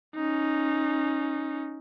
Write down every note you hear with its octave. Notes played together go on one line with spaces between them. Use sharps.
C#4 D#4